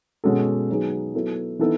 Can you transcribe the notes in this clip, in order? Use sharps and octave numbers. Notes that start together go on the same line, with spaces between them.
B2 G#3 C#4 F#4 A4
F#3 B3 D#4 G#4
F#3 B3 E4 A4
E3 B3 D#4 A4